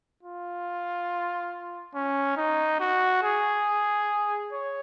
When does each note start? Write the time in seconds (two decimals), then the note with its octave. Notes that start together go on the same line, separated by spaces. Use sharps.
0.23 F4
1.94 C#4
2.37 D#4
2.80 F#4
3.23 G#4
4.52 C#5